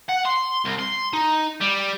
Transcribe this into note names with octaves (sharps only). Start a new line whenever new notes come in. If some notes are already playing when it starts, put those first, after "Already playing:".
F#5
C6
C2
C6
D#4
G3